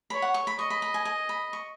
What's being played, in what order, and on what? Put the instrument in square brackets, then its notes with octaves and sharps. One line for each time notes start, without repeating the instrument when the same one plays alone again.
[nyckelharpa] C#5 [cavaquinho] B5
[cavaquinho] F#5
C#6
B5
[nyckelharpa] D#5 [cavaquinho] C#6
[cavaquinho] B5
B5
G#5
G#5
B5
C#6